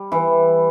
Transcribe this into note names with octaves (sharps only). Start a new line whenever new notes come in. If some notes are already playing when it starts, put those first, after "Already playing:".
Already playing: G3
E3